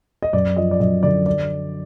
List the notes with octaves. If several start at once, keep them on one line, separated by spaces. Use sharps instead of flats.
D#5
F#2 D5
F3 D#5
D5
F#2 D#5
D3 D5
D5